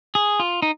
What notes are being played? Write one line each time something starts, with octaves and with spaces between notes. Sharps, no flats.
G#4
F4
D#4